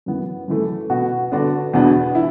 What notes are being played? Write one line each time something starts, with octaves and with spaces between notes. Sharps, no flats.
F#2 E3 B3
F#2 E3 A3
B2 B3 F#4
D3 B3 D4 F#4
E2 B2 B3 D4
E4